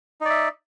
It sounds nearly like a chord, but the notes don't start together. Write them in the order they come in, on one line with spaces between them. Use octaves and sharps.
D#4 D5 E5